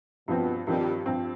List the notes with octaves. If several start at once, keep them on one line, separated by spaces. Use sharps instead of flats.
G2 B2 F3 C4
G2 D#3 F3 G3 C4
G2 F3 C4